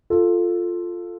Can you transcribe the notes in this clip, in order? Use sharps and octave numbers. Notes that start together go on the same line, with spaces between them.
F4 A4